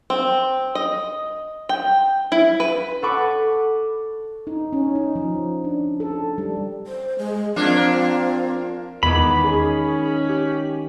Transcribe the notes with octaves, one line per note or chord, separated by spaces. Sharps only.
C4
D#5
G5
E4
B4
A4 F#5 B5 C#6 D6
D#4
C#4
D#4
F3
D4
A4
G3
C5
G#3
F3 A#3 C4 D4
E2 D#3 G#3 B3 B5 D6
C#4 G#4
G4